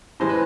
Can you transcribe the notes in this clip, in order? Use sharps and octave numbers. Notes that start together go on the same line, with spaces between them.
A2 E3 G#3 C5
B4